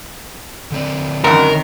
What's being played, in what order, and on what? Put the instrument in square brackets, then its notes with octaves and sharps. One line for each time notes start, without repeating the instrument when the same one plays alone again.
[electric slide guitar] D3 C4 D5
[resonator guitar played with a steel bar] F#2 B2 [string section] D#3 [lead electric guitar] A#4